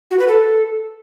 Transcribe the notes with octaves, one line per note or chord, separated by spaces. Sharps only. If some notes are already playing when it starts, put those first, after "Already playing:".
F#4
B4
A4